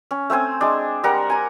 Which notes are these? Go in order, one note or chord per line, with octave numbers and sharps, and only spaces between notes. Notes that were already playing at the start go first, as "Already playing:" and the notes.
C#4
A3 C4 C5 G#5
G#3 D4
G3 A#4 F#5
G#5 A#5